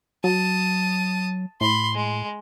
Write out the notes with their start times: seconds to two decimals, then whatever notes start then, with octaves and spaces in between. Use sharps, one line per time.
0.24 F#3 A5 D#6
1.61 A2 B5 C6
1.94 G#3